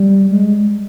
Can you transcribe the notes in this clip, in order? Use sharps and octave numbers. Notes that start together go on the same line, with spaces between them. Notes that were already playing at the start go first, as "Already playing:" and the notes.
Already playing: G3
G#3